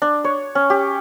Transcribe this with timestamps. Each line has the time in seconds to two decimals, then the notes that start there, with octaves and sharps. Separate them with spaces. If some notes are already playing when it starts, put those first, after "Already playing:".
0.02 D4
0.24 C#5
0.55 C#4
0.70 G4